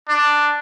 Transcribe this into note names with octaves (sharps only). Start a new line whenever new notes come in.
D4